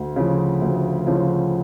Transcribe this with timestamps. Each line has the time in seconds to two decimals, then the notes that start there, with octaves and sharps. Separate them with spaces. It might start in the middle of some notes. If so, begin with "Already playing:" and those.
Already playing: D2
0.16 C#3 F3
0.61 D2
1.07 C#3 F3